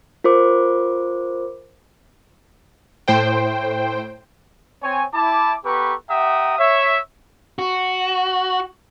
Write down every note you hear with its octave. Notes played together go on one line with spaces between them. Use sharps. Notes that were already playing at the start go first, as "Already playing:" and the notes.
F4 A#4 C5 D6
A2 C5 G5
C4 C#5 G#5
E4 A5 D6
B3 G4 A4 B4 A#5 C#6
G4 E5 F#5 G5 A#5 D#6
C#5 E5
F#4